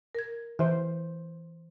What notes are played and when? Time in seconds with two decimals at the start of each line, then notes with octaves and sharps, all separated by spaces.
0.15 A#4 G#6
0.59 E3 C5 E5